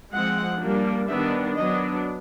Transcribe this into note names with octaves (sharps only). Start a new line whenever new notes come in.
F3 G#3 C4 F#5
G3 A#3 D4
D#3 G3 B3 D4 E5
F#3 B3 D4 D#5